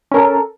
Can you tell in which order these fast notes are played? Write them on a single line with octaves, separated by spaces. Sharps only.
C#4 A#4 A4